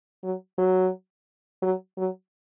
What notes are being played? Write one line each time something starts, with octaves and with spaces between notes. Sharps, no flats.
F#3
F#3
F#3
F#3